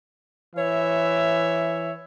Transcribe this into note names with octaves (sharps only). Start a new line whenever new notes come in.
E3 C#5 E5